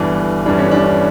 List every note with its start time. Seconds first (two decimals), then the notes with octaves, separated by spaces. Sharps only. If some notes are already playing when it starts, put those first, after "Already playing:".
Already playing: G1 G2 E3 D4
0.46 G1 G2 E3 D4
0.59 C#4
0.71 D4